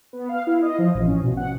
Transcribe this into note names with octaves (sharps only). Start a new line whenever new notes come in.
B3
F5
E4
D#5
F3
A1
C#4
B2
F#5